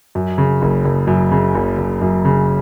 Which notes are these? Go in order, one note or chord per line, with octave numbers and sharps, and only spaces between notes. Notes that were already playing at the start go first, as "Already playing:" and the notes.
F#2
C#3
F#1
F#1
F#2
C#3
F#1
F#1
F#2
C#3